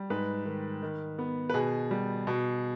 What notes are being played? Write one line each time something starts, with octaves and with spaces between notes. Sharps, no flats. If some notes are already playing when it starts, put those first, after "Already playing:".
Already playing: G3
G#2 B4
D#3
D#3
B3
B4
B2 G#4
G3
B2